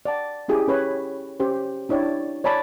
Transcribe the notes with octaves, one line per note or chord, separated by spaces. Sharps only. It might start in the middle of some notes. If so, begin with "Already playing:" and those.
D5 F#5 A5
C#4 E4 G4 G#4
C#4 B4 C#5 B5
C#4 G4 C5
D4 E4 C#5 D5 G5
C#5 D5 G#5 A5 B5